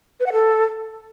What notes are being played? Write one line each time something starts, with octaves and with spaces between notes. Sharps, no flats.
B4
F#5
A4